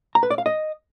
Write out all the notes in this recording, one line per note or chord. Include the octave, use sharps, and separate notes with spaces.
A#5
B4
D5
F5
D#5